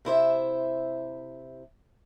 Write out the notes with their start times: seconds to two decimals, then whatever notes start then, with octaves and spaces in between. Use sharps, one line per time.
0.05 C3 E4 C5 E5